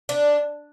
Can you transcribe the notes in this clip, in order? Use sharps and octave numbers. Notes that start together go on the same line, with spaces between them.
D4